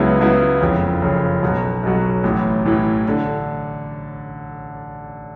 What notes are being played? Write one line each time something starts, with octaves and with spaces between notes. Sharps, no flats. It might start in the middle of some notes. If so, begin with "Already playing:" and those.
Already playing: C#2 C#3 F#3 B3 E4
C#2 C#3 F#3 B3 E4
F#1 F2 C#3
F#1 F2 C#3
B1 B2 F#3
B1 B2 F#3
A1 A2 E3
A1 A2 E3
D3